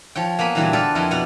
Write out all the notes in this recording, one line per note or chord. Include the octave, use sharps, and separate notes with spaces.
F3 C#5 G5
A#3 B3 G#4 B5
A#2 D3 E3 F#3 G3 B3
F4 A4 B4 D5 F5 G5
F2 E4 A#4 B4 D#5
B2 B3 D5 F#5 A#5